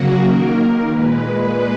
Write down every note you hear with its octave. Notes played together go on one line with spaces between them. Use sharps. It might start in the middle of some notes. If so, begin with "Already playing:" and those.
Already playing: C#3 F#3 A#3 F#4
D#3 A#3 A#4
A#2 G#3 B4